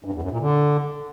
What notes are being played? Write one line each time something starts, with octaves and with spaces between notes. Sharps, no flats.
G2
E2
F#2
A#2
D3